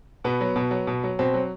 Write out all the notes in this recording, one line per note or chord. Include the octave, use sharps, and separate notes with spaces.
B2 B3
F#3
B2
F#3
B2
F#3
B2 C4
F#3